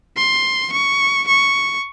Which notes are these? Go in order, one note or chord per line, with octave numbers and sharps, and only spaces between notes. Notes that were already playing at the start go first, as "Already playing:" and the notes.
C6
C#6
C#6